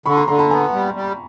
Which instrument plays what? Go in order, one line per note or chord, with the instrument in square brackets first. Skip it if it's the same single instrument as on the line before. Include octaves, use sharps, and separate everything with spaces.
[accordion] D3 [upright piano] B5 C#6
[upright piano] A#5 C6
[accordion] D3 [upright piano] A#5 C6
[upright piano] A5 B5
[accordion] B3 [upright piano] G#5 A#5
[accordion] G3
G3